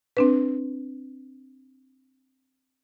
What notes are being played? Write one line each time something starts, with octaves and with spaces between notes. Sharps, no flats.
C4 D4 B4